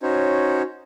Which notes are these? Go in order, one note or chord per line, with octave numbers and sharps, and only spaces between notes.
C#4 D#4 F#4 C5 C#5